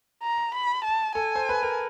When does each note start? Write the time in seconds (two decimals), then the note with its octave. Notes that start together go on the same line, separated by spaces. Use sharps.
0.23 A#5
0.54 B5
0.84 A5
1.15 A4 G#5
1.36 C5
1.49 B4
1.63 A#4